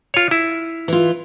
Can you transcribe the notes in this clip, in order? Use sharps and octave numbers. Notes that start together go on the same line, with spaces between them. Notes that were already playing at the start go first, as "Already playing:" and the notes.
F4 C#5
E4
E3 F4